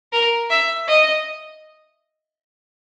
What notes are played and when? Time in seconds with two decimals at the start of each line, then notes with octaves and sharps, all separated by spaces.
0.13 A#4
0.50 E5
0.88 D#5